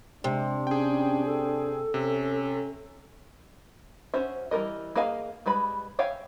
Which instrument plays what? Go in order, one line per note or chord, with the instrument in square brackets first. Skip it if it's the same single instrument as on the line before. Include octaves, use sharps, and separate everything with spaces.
[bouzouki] C3 [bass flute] G#3 [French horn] D4
[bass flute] C#4 [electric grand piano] G#4 G5
[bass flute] A4
[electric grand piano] C3 [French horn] C#4
[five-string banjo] C#4 F#4 C5 E5
E3 G3 A#4 D#5
A#3 G#4 D#5 F5 G#5
G3 G#3 B4 B5
C#5 E5 F5 G5 G#5